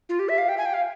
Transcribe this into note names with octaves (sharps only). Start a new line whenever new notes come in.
F4
G4
E5
F5
G5
G#5
G5
F5